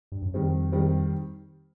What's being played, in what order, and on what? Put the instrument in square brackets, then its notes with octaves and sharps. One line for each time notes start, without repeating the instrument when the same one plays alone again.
[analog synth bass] G2
F#2
[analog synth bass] F2 [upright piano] D#3 G3 C4
[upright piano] D#3 G3 C4